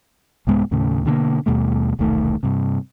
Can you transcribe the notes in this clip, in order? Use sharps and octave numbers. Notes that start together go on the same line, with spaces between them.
C2 G#2 G#3 B3
D#2 A2 C#3 A3
B2 D3 E3 A#3
D#2 B2 G3 A3
E1 C2 D#3 A3
G2 C3